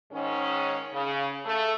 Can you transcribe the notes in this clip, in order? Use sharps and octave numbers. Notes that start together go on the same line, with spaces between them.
G#2 D#3 C#4
C#3
A3